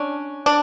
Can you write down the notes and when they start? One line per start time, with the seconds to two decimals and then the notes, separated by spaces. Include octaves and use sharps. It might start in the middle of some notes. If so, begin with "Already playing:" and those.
Already playing: C#4 D4
0.46 D4